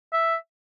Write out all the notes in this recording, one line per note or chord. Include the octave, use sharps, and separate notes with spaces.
E5